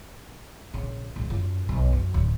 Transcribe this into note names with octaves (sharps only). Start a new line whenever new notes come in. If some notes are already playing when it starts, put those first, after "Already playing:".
A#1 C#3
A#1 E2
F#2 F4
B1
F#2
D1